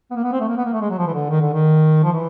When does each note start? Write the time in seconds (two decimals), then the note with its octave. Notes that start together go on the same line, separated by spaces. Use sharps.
0.10 B3
0.15 A#3
0.23 B3
0.32 C4
0.40 A3
0.48 A#3
0.57 B3
0.65 A#3
0.73 A3
0.81 G#3
0.90 F#3
0.98 F3
1.06 E3
1.13 D3
1.30 D#3
1.41 D3
1.53 D#3
2.03 F3
2.12 E3